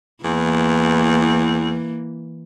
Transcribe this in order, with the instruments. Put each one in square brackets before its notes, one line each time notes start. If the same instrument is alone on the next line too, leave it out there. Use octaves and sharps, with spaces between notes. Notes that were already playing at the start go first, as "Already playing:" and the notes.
[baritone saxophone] E2 [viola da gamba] E3 A#3